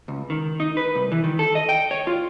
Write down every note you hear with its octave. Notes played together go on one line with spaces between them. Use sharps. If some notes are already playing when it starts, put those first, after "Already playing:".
C#2
D#3
D#4
B4
C2
E3
D#3
A4
D#5
G5
C#5
F4